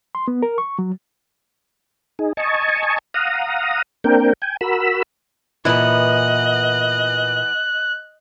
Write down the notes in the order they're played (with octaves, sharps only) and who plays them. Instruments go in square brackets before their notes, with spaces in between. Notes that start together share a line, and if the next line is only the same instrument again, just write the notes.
[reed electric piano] C6
B3
A#4
C#6
F#3
[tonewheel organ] D#4 G#4
D#5 G#5 A5 C#6
F5 F#5 A#5 D#6
A#3 C4 D4 A#4 G5
G5 G#5
F#4 A#4 B5 E6
[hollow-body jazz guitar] A#2 E4 [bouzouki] E3 B3 [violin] D#5 [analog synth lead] F#6